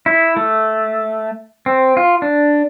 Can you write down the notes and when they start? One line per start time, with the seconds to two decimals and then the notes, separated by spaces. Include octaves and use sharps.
0.06 E4
0.37 A3
1.66 C4
1.97 F4
2.22 D4